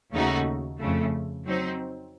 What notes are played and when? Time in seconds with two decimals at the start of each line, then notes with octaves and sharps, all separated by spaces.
0.13 D#2 C#3 A3 D#4 F#4
0.79 F2 C#3 A3
1.45 F#3 C4 D#4